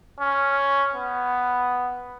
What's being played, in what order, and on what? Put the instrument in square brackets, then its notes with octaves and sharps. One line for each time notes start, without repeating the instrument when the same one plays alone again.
[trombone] C#4
B3